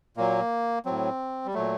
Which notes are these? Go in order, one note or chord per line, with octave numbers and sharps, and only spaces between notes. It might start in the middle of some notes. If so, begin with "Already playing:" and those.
A#2 F#3 A#3
A2 F#3 C4
G3
A#2 F#3 A3